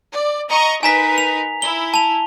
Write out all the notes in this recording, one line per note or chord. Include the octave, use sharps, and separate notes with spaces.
D5
D#5 A#5 C#6
D#4 A#4 B4 G#5 A#5 B6
F7
E4 G7
A5 F7